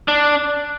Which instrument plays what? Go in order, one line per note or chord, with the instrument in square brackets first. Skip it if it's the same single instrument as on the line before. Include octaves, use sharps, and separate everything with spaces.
[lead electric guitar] D4